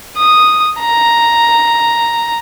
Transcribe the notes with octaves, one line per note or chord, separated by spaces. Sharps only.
D#6
A#5